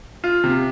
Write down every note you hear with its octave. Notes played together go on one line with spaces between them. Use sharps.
F4
C3